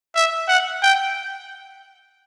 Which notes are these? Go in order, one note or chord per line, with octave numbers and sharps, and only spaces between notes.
E5
F#5
G5